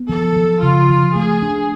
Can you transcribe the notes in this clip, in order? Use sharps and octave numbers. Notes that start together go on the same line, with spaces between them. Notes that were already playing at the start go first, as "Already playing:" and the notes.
Already playing: B3
F3 A4
F3
C#3 F4
F3
A3 G#4
D4